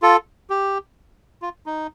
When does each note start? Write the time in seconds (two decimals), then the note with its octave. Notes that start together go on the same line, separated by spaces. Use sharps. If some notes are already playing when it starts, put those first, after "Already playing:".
0.02 F4 A4
0.50 G4
1.42 F4
1.66 D#4